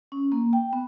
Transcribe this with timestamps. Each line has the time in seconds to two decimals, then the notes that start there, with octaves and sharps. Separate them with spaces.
0.12 C#4
0.32 A#3
0.53 G5
0.73 B3